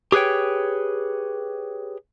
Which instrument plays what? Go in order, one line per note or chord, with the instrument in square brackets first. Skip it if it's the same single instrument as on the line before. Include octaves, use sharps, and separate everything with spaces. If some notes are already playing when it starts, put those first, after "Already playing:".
[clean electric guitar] G4 G#4 B4 C#5 G5